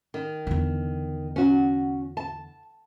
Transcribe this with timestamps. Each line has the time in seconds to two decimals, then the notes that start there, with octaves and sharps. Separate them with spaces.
0.14 D#3
0.47 E2 D3
1.36 C#4 F#4
2.17 A5